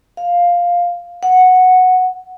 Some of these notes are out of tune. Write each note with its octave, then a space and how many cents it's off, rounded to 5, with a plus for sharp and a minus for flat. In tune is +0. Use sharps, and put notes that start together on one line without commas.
F5 +5
F#5 -5